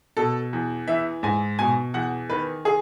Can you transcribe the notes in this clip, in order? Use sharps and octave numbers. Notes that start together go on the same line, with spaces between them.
B2 A4
E2
E3 E5
G#2 G#5
B2 G#5
E2 F#5
D#3 B4
G#4